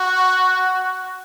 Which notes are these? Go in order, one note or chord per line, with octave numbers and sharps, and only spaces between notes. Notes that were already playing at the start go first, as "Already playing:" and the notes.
Already playing: F#4